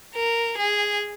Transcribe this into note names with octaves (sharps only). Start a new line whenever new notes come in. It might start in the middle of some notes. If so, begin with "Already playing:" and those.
A#4
G#4